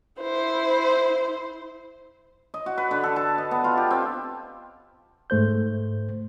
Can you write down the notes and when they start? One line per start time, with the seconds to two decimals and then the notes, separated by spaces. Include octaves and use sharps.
0.21 E4 C5
2.54 D#5
2.66 F#4
2.78 B4
2.91 D3
3.03 A4
3.16 A5
3.38 D#5
3.51 B3
3.64 F4
3.77 G4
3.91 C4
5.30 G#2 A3 C5 G6